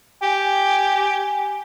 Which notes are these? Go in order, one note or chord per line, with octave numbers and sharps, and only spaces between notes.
G4 G#5